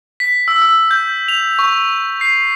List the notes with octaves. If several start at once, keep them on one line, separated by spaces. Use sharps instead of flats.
B6
E6
E6
G6
F7
C#6
C7